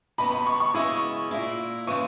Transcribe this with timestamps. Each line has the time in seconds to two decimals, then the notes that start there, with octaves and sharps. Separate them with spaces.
0.18 D#2 C#3 G#3 B3 B5
0.31 B5
0.46 C#6
0.60 C#6
0.74 F#2 C#3 G#3 B3 E4 C#6
1.31 A#2 A#3 E4
1.87 C#3 E3 G#3 C#6